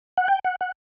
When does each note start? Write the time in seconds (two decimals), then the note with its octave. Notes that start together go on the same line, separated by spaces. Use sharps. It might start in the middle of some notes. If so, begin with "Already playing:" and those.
0.17 F#5
0.28 G5
0.45 F#5
0.61 F#5